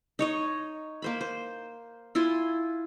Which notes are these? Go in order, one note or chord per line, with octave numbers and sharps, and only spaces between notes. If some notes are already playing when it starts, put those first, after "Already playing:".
D#4 C#5 D#5
A#3 C5 B5
C5
E4 F4 G#5 C6